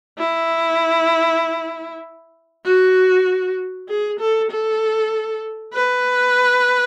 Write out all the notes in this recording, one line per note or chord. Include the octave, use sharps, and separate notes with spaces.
E4
F#4
G#4
A4
A4
B4